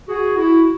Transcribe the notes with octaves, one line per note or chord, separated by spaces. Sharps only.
F#4 G#4
E4 F#4